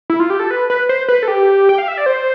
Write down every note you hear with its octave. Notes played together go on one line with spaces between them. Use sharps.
E4
F4
G4
A4
B4
B4
C5
B4
A4
G4
G5
F5
E5
D5
C5